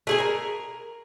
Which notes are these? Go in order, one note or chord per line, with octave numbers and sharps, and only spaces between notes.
A3 G#4 G#5
A#4